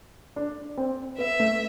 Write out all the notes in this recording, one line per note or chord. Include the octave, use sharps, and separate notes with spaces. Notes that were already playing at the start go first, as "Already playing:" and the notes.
D4
C4
B3 E5
A3